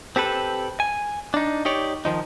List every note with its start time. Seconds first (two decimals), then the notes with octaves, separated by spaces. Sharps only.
0.16 C4 G4 A4 B4
0.80 G#5
1.34 D4 D#4
1.65 D#4 G4 C#5 D5
2.05 D#3 F3 D#4